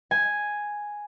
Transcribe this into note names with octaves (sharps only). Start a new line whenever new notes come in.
G#5